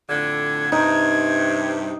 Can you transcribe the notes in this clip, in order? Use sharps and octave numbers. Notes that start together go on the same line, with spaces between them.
F2 A2 D3 G#6
G2 C3 D#4